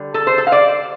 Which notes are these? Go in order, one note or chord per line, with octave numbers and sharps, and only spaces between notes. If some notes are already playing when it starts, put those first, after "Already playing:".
Already playing: D3 G3
A4
C5
A4
F5
D5